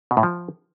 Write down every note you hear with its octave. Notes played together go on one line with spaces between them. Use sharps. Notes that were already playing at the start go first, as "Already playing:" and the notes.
B2
A2
F3